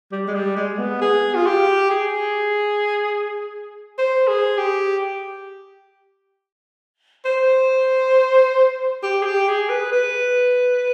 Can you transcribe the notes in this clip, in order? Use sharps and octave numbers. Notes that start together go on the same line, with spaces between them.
G3
G#3
G3
G#3
B3
G#4
F4
G4
G#4
C5
G#4
G4
C5
G4
G#4
G4
G#4
B4
B4